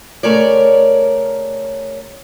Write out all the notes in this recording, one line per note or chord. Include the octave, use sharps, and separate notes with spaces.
C#3 A3 A#4 C#5 D5